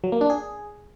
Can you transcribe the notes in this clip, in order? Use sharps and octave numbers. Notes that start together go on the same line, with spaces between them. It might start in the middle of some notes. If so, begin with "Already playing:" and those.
F#3
A#3
D4
G#4